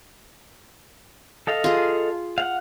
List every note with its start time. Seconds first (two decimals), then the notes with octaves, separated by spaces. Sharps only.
1.47 A4 D#5 F5
1.64 F4 G#4
2.38 F5 F#5